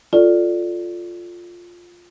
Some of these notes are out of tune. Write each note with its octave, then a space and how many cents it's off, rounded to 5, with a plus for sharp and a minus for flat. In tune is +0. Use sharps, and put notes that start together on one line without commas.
F4 +5 A4 +0 D5 +0